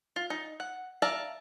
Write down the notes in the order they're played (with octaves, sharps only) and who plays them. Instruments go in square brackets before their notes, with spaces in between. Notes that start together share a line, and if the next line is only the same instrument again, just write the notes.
[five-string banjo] F4
D#4
F#5
D5 E5 F5 A5 A#5